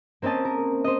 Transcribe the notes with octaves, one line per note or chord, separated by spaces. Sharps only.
A#3 C4 C#4 D#5 A5
A#4
C5 D#5